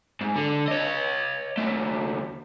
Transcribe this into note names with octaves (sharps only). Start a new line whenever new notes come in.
G#2
D3
C#5 D#5
D#2 A3